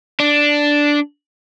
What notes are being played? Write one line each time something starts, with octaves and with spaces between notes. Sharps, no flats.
D4